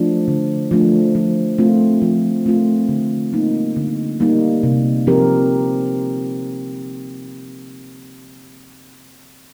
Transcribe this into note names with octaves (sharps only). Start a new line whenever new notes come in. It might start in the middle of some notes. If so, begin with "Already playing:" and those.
Already playing: F3 A3 D4
D3
F3 A3 D4
F3
A3 C4 F4
F3
A3 C4 F4
D3
G3 A#3 D#4
D3
G3 A#3 D#4
C3
F3 C4 G4 A#4